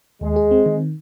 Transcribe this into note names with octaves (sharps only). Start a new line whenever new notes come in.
D#2 G#3
G#4
C4
D#3